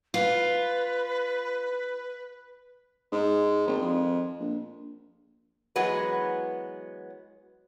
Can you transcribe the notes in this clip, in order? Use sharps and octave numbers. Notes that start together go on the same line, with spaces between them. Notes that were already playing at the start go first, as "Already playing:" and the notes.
F4 B4
G#2
G#1
F2
A#1
E3 F#3 G#3 B3 F#4 B4